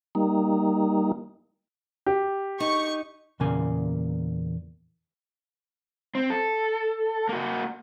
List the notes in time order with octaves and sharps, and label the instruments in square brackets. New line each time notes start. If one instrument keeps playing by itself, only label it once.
[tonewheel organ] G3 A#3 D#4
[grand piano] G4
[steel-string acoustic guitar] D#4 [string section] C#6
[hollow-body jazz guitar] E2 A#2 C#3 A#3 G#5
[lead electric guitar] C4
A4
A#3 F#4